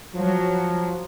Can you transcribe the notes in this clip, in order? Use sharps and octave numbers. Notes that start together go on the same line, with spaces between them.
F3 F#3